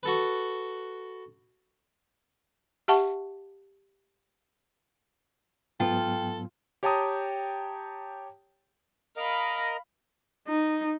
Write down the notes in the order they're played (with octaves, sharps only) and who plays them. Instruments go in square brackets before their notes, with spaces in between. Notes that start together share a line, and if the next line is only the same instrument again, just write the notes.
[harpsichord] F#4 A4 B4
[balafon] G4 E5 F#5 A5 C#6
[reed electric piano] G#2 F#3 B3 [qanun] F4 [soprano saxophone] A4 [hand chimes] G5
[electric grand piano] G4 C#5 G5 A5 A#5 D#6
[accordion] A#4 D#5 A#5 [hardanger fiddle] F5 B5
[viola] D#4